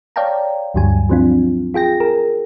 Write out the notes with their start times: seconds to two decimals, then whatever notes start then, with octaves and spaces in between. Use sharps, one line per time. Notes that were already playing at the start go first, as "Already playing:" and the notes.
0.16 C#5 D5 F5 G5 A5 A#5
0.74 D2 G2 D3 F#3 G3 G#5
1.09 F3 F#3 C4 D4 F4
1.74 F4 G#4 G5 A#6
2.00 G#4 A#4